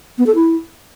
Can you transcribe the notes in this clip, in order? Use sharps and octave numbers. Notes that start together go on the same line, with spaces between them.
B3
A4
E4